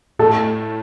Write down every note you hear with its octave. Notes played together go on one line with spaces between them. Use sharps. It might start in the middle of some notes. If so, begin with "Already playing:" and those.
A2 A4